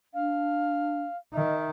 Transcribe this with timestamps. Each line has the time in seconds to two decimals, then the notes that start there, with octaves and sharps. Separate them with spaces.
0.14 D4 F5
1.34 D#3 D#5 E5